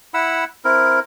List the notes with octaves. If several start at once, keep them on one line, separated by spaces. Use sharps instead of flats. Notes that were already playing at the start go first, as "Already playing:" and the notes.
E4 F#5 B5 E6
C4 E4 A#4